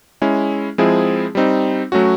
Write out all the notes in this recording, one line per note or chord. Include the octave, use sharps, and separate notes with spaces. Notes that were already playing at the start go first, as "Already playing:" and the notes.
G#3 C#4 E4
F3 G#3 C4 E4 G#4
G3 C4 D#4
F#3 A3 C#4 F#4